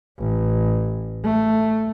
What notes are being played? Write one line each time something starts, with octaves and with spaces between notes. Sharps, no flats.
A1
A3